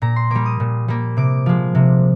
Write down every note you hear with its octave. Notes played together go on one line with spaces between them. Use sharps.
A#2 A#5
C6
G3 A#3 D6
D#6
A#2
G3 A#3
C3 D6
F3 G#3
C3